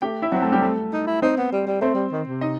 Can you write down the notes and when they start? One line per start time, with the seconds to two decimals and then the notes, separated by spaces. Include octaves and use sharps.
0.02 A3 G4 G5
0.22 E4 E5
0.32 F#3 C4 F#4
0.42 A3 A4
0.52 G3 G4
0.62 A3 A4
0.93 D#4
1.07 E4
1.22 C4 D#4 C5
1.37 B3
1.52 G3
1.67 G3
1.81 A3 C4 C5
1.94 G3
2.12 D#3
2.27 C3
2.41 D#4 D#5